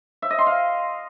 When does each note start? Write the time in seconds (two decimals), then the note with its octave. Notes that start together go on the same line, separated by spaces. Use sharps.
0.22 E5
0.30 D#5
0.38 C6
0.46 F5